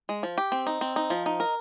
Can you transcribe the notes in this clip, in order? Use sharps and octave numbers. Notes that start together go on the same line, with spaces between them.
G#3
F3
G4
C4
D#4
C4
D#4
F3
D#4
A#4